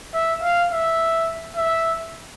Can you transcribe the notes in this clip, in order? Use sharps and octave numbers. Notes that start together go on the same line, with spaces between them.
E5
F5
E5
E5